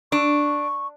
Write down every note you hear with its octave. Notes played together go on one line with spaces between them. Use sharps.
D4 C#6